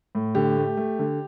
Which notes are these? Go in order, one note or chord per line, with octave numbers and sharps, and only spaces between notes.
A2
D3 G4
A3
A3
D3